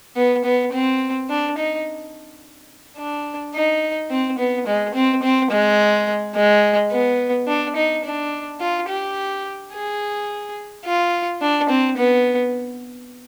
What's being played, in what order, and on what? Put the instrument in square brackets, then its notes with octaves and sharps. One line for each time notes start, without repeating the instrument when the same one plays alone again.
[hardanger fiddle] B3
B3
C4
D4
D#4
D4
D#4
C4
B3
G#3
C4
C4
G#3
G#3
B3
D4
D#4
D4
F4
G4
G#4
F4
D4
C4
B3